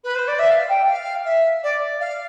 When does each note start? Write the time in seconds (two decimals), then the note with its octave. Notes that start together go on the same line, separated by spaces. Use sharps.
0.03 B4
0.15 C5
0.27 D5
0.39 E5
0.50 F5
0.68 G5
0.87 F5
1.24 E5
1.63 D5
2.00 F5